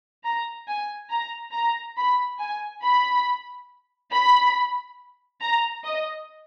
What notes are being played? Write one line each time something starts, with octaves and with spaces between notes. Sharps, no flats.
A#5
G#5
A#5
A#5
B5
G#5
B5
B5
A#5
D#5